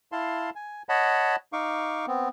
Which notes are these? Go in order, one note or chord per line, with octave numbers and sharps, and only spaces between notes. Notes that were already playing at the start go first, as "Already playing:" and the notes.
E4 F5 A5 C6
G#5
C#5 D#5 F#5 A5 B5
D#4 F5 C#6 D6
B3 C4